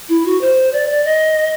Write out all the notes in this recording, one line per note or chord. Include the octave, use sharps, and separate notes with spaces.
E4
F#4
C5
D5
D5
D#5